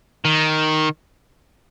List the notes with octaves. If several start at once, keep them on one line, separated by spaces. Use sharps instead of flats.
D#3